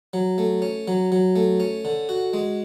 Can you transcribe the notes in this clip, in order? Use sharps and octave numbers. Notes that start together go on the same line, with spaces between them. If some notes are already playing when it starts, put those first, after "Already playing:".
F#3
A3
C#4
F#3
F#3
A3
C#4
D3
F#4
G#3